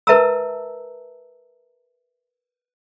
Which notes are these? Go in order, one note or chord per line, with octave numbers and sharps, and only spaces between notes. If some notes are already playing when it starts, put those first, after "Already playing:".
A#4 B4 E5 A5 A#5 E6